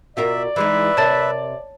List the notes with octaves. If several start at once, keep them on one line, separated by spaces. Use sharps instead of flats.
B2 F4 A#4 D5 E5
E3 G#3 D#4 B4 E5
C3 A#4 C#5 A5 A6